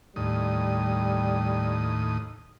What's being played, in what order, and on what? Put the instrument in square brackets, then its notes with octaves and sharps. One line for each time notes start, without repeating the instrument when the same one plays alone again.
[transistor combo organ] D#2 A2 D#6 [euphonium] G3